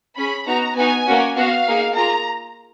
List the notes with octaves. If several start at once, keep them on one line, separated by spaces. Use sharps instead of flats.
C#4 G#4 B5
B3 D#4 F#4 A#5
B3 D#4 F#4 G#5
A#3 C#4 F#4
B3 F#4 F5
A#3 D#4 G#4
A#3 F4 G#4 A#5